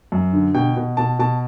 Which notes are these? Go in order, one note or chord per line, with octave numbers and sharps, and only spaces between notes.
F#2
D3
B2 G5
B2
B2 A5
B2 A5